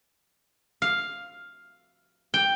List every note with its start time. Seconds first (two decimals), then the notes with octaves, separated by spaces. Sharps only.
0.82 F5
2.34 G5